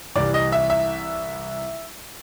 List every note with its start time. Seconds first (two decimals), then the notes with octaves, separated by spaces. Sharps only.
0.16 C2 C3 E3 G3 D5
0.34 D#5
0.52 E5
0.70 E5